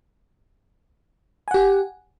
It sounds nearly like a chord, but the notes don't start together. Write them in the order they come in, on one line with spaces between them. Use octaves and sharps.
G#5 F#5 G4